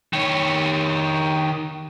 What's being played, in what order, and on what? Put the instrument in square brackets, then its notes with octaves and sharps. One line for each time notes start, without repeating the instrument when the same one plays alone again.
[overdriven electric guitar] D#3 C#5